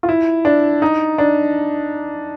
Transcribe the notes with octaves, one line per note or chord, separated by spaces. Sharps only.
F4
E4
D4
D#4
D4